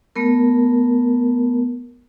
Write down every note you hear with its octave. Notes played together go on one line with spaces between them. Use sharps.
A3 B3 A#4